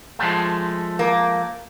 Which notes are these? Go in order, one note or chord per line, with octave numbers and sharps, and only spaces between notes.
F3 G#3 A3
A#3